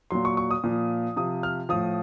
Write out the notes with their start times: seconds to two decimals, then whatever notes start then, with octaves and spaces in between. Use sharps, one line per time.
0.11 A#2 F#3 C6
0.25 C#6
0.37 C#6
0.51 D#6
0.64 A#2 F3
1.16 C3 F3 D#6
1.43 F6
1.69 A2 F3 D#6